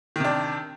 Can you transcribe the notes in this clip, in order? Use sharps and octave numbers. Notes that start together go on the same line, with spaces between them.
C3 D#3 D4